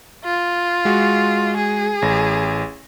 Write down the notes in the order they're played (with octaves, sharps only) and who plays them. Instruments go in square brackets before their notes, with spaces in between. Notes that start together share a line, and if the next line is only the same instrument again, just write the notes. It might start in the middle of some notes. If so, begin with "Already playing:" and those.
[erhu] F4
[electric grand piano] G#3 F#4
[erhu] G#4
[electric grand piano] A1 A#6